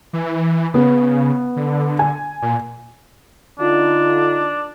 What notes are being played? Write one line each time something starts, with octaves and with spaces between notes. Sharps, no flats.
E3
C#3 B3
D3
G#5
A#2
D3 D4 D#4 F4